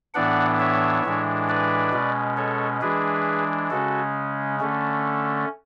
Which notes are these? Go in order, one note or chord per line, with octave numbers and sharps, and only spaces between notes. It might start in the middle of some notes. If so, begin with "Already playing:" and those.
A2 E3 B3 D4 D5 F#5
C#5 E5
A2 E3 G#3 D4
B4 D5
B2 G#3 C#4
A4 C#5
E3 G#3 D4 G#4 B4
C#3 G#3 C#4 F#4 A4
D3 A3 C#4